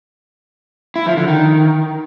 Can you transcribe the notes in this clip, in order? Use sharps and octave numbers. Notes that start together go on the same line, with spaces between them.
E4
F3
D3
D#3